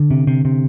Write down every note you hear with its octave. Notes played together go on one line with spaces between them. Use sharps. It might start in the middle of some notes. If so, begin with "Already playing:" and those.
Already playing: D3
C3
C3
C3